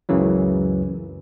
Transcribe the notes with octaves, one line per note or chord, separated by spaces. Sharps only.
C#2 F#2 C#3 E3 F#3